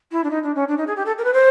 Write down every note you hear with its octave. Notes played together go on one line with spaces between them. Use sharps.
E4
D4
D#4
D4
C#4
D4
D#4
G#4
G4
A4
A#4
B4
C5